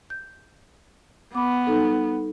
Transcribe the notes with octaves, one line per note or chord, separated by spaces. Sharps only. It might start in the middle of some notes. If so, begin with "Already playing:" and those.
G6
B3 B5 D6
G3 D#4 A4